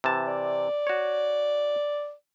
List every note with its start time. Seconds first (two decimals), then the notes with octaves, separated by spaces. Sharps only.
0.04 C3 E3 A5
0.27 D5
0.87 F#4 C#5